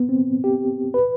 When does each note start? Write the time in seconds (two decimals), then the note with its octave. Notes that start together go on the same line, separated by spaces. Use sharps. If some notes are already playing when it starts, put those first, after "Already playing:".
Already playing: B3
0.09 C4
0.44 G4
0.94 B4